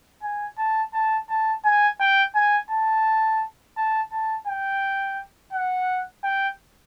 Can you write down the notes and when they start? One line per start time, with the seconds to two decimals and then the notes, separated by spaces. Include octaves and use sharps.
0.23 G#5
0.58 A5
0.93 A5
1.29 A5
1.65 G#5
2.00 G5
2.35 G#5
2.71 A5
3.77 A5
4.12 A5
4.47 G5
5.53 F#5
6.24 G5